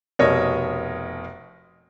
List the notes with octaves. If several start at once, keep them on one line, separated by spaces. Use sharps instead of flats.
F1 B2 A#4 C#5 D#5